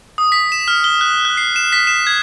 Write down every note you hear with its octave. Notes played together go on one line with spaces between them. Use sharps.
D#6
B6
E7
F6
G7
F#6
F#6
C7
E7
B6
E7
G#6